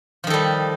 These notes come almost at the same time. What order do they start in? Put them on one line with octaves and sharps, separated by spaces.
F3 D#3 A4 G3